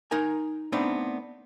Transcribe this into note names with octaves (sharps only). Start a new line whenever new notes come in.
D#4 A#4 G#5
A3 B3 C4 D4 D#4